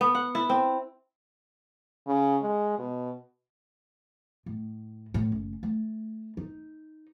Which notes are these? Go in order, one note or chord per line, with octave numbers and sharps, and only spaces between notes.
B3
F#5
E4
C4
C#3
G#3
B2
A2
A2
F#1
A3
D#4